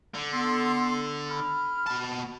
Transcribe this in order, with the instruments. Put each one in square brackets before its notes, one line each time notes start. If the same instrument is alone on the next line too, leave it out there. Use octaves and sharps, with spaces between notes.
[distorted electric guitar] D3
[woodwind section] B3 A4 C6
B5 F6
[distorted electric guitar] B2 A5